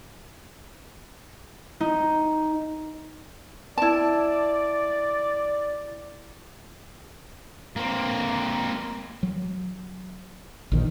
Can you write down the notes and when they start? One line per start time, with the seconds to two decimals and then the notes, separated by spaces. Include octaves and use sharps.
1.80 D#4
3.78 E4 D5 A5
7.76 A#3 C4
9.23 F#3
10.72 A#1 D#3